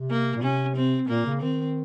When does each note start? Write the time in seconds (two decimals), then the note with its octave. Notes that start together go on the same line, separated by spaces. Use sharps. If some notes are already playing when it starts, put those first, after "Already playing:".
Already playing: C3
0.10 A#3
0.36 A#2
0.42 C3 C#4
0.76 C4
1.09 A#2 A#3
1.26 C#3
1.41 D#3 C4